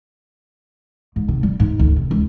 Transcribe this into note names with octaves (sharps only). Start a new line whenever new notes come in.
G#2
C3
G3
G#2
D2
C3
C#2